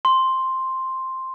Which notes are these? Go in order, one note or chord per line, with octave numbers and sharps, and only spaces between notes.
C6